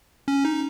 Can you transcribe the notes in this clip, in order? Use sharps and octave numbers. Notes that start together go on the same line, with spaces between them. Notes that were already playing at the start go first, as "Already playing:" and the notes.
C#4
D#4